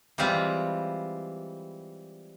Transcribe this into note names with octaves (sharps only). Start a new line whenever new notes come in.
E3 G3 G#3 C4 F4